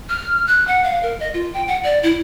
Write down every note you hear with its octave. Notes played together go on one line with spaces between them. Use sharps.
F6
F#6
F#5
F5
A#4
D#5
F4
G5
F#5
D5
E4